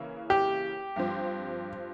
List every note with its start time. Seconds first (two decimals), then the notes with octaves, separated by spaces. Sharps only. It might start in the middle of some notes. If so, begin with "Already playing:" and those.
Already playing: C#3 E3 A#3 E4
0.30 G4
0.96 G2 F3 C4